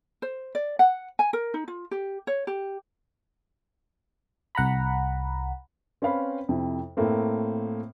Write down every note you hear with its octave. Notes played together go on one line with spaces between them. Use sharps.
C5
D5
F#5
G#5
A#4
D#4
F4
G4
C#5
G4
C2 F#5 A#5 B5
C4 C#4 B4 F5 B5
F2 C3 E4
A2 A3 A#3 C4